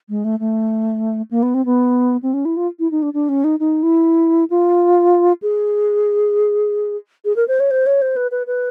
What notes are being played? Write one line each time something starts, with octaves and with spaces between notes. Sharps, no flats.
G#3
A3
A3
A#3
B3
C4
B3
C4
C#4
E4
F4
E4
D#4
D4
D4
C#4
D#4
D#4
E4
F4
G#4
G#4
A#4
C5
C#5
C5
C#5
C5
B4
B4
B4